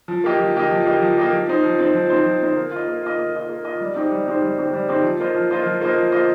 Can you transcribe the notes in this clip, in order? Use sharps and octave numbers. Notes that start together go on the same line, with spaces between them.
F3
A#3 G4 D#5
F3
A#3 G4 D#5
F3
A#3 G4 D#5
F3
A#3 G4 D#5
F3
C4 D#4 C5
F3
C4 D#4 C5
F3
C4 D#4 C5
F3
C4 D#4 C5
A#3
F4 D#5
A#3
F4 D#5
A#3
F4 D#5
A#3
F4 D#5
G3
C4 D#4 G4 C5
G3
C4 D#4 G4 C5
G3
C4 D#4 G4 C5
G3
C4 D#4 G4 C5
F3
A#3 F4 C5 D#5
F3
A#3 F4 C5 D#5
F3
A#3 F4 C5 D#5
F3
A#3 F4 C5 D#5